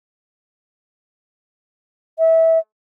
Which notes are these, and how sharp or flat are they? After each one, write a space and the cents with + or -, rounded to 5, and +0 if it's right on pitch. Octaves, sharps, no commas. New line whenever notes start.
E5 -20